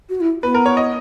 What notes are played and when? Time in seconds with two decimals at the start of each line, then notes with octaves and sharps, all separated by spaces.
0.09 F#4
0.21 E4
0.43 B3 B4
0.54 A#4
0.66 C#5
0.77 D#5